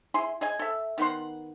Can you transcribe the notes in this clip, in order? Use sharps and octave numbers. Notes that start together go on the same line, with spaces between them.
E4 G#4 C6
G#4 D#5 G#5
A4 E5
D#3 B3 F#5 C6